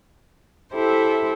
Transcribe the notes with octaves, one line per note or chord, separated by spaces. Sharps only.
E4 G4 A4 C5 E5